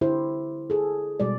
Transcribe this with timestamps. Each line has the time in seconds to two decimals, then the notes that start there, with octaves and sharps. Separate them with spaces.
0.01 D3 E4 G4 C5
0.70 G#4 A4
1.20 B2 G3 G#3 D5